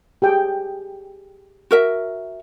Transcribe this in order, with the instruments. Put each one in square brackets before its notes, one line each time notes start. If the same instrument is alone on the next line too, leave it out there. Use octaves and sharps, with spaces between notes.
[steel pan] G4 G#4 G5
[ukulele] F#4 A#4 E5